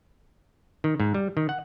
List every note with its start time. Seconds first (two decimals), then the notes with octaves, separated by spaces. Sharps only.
0.84 D#3
1.00 G#2
1.14 G3
1.37 D#3
1.49 F#5